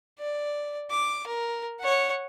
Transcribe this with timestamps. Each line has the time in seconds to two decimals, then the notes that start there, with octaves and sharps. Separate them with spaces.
0.19 D5
0.90 D6
1.27 A#4
1.80 C#5 F#5